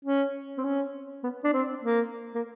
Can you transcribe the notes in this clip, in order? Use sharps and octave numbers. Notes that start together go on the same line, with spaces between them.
C#4
C4
C#4
B3
D4
C4
A#3
A#3